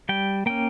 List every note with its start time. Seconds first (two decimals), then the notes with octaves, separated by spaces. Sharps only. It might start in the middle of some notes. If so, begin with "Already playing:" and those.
0.09 G3 G5
0.46 A#3 C#4 G5